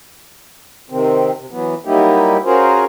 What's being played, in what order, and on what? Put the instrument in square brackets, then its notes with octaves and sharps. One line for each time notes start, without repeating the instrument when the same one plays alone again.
[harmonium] C3 D#3 C4
C3
E3 F#3 B3
F#3 G3 A#3 D#4 E4 G4
C#4 F4 F#4 G#4 A#4 C5